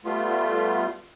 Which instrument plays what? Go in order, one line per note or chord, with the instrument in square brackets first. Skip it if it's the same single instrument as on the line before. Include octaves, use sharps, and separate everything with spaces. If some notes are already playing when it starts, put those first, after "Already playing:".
[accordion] G3 A3 B3 F4